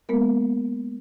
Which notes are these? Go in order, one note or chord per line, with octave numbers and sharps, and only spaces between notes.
G#3 A#3 B3 A#4